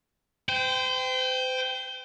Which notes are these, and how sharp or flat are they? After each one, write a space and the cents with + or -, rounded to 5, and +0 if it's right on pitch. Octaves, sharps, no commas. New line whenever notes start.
C5 -35 G5 +0